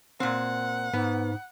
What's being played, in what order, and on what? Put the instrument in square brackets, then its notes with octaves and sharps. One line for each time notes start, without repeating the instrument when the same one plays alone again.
[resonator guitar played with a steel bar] A#2 C4 [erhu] F#5
[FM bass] G#2 [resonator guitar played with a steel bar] B3